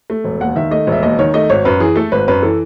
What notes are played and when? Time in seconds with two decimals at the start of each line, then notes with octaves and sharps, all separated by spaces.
0.10 A3
0.24 E1
0.40 D#2 F#5
0.55 D#3 E5
0.71 A3 D#5
0.87 E1 E5
1.02 D#2 D#5
1.19 D#3 C#5
1.34 A3 D#5
1.50 G#1 C#5
1.65 F#2 B4
1.80 E3 G#4
1.96 A3 A4
2.12 G#1 B4
2.28 F#2 B4
2.42 E3 A4